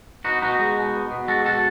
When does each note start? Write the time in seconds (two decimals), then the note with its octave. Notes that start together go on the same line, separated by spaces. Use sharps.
0.24 B3 D#4 F#4
0.42 B2 D#4 F#4
0.59 G#3
0.77 B2
0.94 B3
1.11 B2
1.28 G#3 F#4 A4
1.45 B2 F#4 A4